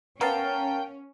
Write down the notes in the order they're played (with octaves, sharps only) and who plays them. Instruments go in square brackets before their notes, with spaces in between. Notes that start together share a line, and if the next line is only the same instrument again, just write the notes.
[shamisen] B3 [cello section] C#4 [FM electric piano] A#4 F5 A5 [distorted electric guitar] G5